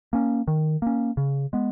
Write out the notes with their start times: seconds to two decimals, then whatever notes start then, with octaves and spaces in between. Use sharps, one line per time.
0.13 A#3 C#4
0.48 D#3
0.82 A#3 C#4
1.17 C#3
1.53 G#3 B3